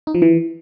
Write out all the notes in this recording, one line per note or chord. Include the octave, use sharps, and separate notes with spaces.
D#4
F3
E3